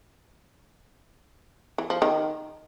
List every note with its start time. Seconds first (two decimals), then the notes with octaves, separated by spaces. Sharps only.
1.78 E3
1.90 F3
2.02 D#3